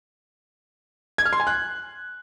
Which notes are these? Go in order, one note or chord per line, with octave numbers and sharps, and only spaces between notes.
G#6
F6
C6
G#5
F#6